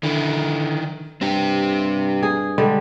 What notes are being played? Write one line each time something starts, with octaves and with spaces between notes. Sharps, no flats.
D3 D#3 E4
G2 C4 G4
G#4
D3 G3 G#3